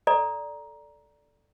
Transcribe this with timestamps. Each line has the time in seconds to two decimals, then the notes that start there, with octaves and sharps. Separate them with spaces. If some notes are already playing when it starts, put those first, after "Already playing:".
0.07 A4 D5 A#5